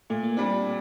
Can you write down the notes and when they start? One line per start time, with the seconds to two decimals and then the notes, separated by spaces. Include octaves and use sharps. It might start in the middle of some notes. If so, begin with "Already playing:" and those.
0.10 A#2 A3
0.23 A#3
0.37 G3 C4 D4